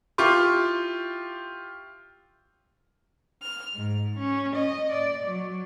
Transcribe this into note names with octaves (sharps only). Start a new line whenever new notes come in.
E4 F4 G4 C#6 D6
F6
G#2
C#4
D#5
D5
F#3